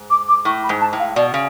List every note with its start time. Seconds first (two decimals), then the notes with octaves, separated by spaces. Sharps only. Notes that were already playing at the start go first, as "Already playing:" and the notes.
Already playing: G#2
0.10 D6
0.28 D6
0.45 A2 C#6
0.63 B5
0.69 G#2
0.81 A5
0.93 A2
0.99 F5
1.16 B2 D5
1.34 C#3